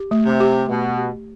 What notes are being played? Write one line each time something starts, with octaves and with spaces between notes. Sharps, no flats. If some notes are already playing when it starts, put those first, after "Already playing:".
Already playing: G4
A3
C3
G4
B2 A3
G4